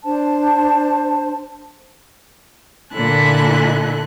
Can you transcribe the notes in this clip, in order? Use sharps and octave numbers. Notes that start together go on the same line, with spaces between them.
D4 C5 A5
A#2 D3 E4 A4 G#5 F#6